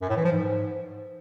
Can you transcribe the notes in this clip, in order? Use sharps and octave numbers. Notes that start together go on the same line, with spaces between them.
F#2
A2
E3
F3
G#2